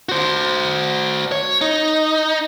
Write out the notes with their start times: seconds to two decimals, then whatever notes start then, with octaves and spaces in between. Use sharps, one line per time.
0.09 F#4 C5
1.32 C#5
1.61 D#4